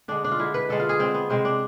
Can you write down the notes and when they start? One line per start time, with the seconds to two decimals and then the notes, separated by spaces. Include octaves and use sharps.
0.08 D3 G#3 D4
0.24 D4
0.31 F4
0.39 D3 G#3 E4
0.54 B4
0.69 D3 G#3 A4
0.80 F4
0.89 G#4
0.99 D3 G#3 C4
1.14 B3
1.30 C3 G#3 C4
1.45 D4